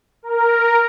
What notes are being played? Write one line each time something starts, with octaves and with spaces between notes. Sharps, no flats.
A#4